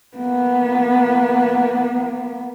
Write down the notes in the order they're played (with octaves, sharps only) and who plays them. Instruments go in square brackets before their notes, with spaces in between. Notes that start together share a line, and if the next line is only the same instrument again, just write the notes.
[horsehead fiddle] A#3 B3